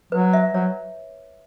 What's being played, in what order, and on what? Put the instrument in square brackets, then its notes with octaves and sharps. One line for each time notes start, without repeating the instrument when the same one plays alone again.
[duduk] F#3 [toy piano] B4
[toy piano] E5
[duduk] F#3 [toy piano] C#5